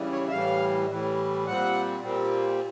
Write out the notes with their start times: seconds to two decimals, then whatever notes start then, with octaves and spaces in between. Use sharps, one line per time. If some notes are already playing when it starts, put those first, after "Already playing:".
Already playing: C#3 E3 G3
0.12 C#5
0.28 E5
0.31 A2 E3 G3 F5
0.90 A2 E3 G3
1.47 A#2 G3 C4 F#5
2.03 A#2 G3 C4